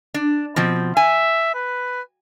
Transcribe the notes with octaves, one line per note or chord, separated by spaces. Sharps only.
D4
B2 F3 C4
E5 G#5
B4